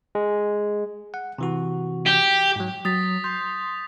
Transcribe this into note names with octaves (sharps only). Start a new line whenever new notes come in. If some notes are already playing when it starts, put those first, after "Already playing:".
G#3
F#5
C3 E3 F#4
G4
G#2 F#3
F#3 D#6 A6 B6
C6 G6 A6 F7